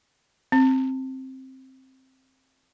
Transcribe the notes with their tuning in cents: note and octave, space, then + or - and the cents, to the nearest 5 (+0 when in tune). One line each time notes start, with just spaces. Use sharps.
C4 +10